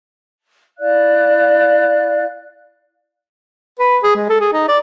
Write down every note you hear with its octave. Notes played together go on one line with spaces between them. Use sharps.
E4 D5 F5 F#6
B4
G#4
G#3
A4
G#4
D#4
D5